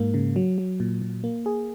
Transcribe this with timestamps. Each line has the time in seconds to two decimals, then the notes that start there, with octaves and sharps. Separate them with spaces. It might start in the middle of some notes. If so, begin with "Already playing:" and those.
Already playing: G#2 A#3
0.14 C#3
0.36 F#3
0.58 F#3
0.80 A#2
1.02 A#2
1.24 A#3
1.46 G#4